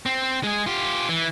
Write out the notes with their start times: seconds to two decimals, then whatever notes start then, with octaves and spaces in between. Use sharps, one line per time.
0.06 C4
0.43 G#3 G#4
0.67 F4 G4
1.09 E3